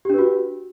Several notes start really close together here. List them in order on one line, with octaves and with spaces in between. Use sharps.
G4 D4 B4 F#4